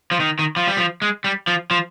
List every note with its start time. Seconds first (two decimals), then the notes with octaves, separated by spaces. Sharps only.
0.11 F3
0.20 D#3
0.39 D#3
0.56 F3
0.67 G3
0.78 F3
1.02 G#3
1.24 G3
1.47 F3
1.71 F3